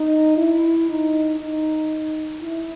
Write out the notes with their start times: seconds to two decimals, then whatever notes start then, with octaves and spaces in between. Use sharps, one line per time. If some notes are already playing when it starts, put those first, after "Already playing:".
Already playing: D#4
0.37 E4
0.89 D#4
1.40 D#4
2.42 E4